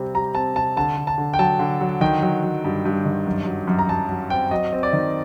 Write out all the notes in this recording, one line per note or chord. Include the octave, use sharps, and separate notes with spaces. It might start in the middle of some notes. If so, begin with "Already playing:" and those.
Already playing: C3 G3 C4
G3 A#5
C4 A5
C3 A5
D3 A5
D3
A5
D3
G5
F#3 A5
D3
F#3
D#3 G5
F#3
F#3
G2
G2
D#3
F#2
F#3
F#2
A#5
F#2 A5
F#3
C4 G5
F#3 D#5
C4
D5
D#3